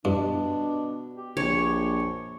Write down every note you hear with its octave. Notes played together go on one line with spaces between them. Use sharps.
G2 B2 D4
G4
A#1 C#5